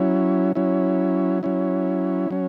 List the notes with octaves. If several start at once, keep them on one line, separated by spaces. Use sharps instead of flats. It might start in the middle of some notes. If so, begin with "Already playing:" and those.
Already playing: F#3 C#4 E4
F#3 C#4 E4
F#3 C#4 E4
F#3 C#4